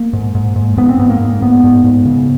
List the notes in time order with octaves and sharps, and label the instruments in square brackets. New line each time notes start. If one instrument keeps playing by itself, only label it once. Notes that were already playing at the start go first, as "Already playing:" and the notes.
Already playing: [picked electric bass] A#3
G#2
G#2
G#2
G#2 B3
C4
G#2 B3
A#3
G#2
G#2 B3
G#2
G#2
C#3